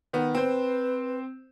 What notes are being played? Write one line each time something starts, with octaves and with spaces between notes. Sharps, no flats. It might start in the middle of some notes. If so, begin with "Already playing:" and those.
D#3 B3
C4 B4 C5